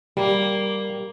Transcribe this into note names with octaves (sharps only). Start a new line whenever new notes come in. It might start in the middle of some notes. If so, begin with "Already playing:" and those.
G3 A#3